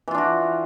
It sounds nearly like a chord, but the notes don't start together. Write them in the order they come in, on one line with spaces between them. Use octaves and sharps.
E3 F4 D4 F#4